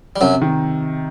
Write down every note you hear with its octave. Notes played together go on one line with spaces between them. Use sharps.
G3
F#2 C3 F#3
D#3